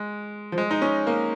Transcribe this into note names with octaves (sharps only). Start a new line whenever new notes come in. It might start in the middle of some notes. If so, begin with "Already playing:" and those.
Already playing: G#3
F3
G#3
D#4
C#4
A#3